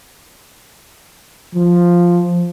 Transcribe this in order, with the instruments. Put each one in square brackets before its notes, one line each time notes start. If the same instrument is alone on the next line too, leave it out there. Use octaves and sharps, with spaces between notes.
[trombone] F3